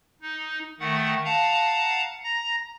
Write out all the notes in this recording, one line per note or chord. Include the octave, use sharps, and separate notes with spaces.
D#4
D#3 A3 F#5
F5 F#5 A5 A#5
A#5 A#6